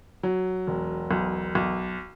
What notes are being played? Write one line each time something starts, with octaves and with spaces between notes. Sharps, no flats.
F#3
E1
B1
B1